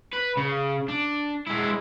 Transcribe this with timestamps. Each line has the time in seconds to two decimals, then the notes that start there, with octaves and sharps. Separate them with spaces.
0.13 B4
0.37 C#3
0.88 D4
1.47 G#3 E4